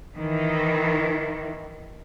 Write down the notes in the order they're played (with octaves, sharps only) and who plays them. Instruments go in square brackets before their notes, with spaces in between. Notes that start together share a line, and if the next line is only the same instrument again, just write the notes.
[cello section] D#3 E3